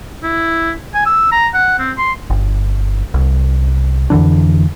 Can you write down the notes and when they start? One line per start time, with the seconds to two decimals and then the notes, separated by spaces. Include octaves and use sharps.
0.23 E4
0.94 G#5
1.06 E6
1.32 A#5
1.54 F#5
1.79 C4
1.98 C6
2.30 G1
3.14 C2
4.10 F2 D3 E3 D4